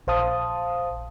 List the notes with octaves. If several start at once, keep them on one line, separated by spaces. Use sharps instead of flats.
A#1 C5 F5 A5 D#6